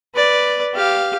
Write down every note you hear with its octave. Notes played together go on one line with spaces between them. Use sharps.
B4 D5
G4 F5